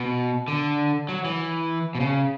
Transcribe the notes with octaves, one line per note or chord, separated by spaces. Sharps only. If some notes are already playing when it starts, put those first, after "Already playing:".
Already playing: B2
D3
F#3
E3
B2
C#3